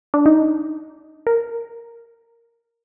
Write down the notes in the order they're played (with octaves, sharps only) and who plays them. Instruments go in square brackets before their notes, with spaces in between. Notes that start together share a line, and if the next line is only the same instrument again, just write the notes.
[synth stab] D4
D#4
A#4